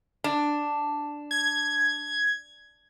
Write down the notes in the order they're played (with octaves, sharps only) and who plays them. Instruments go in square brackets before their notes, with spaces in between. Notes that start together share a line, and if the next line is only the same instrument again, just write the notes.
[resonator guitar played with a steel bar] D4
[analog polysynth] G#6